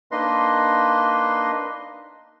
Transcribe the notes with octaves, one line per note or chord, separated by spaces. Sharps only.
A#3 D4 D#4 B4 D#5 C6